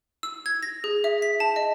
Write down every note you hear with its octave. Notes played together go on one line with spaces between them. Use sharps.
E6
G#6
A#6
G#4
E5
B6
A5
D#5